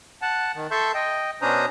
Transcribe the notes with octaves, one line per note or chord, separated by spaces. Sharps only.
F#5 A5
D#3
A4 E5 A5 C6 C#6 G6
D#5 G5
B2 C#4 D4 C5 A#5 D#6